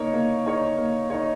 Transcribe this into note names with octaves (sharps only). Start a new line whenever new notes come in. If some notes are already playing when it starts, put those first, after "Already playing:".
Already playing: A#3 D#4 A#4 C#5
A#3
D#4 A#4 C#5
A#3
D#4 A#4 C#5